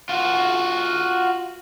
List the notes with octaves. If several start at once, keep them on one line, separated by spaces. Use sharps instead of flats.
F4 F#4